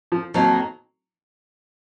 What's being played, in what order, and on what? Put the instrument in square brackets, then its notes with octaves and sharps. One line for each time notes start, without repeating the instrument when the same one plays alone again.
[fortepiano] F3
[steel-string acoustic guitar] F2 D#3 A#3 D#4 [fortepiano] F#3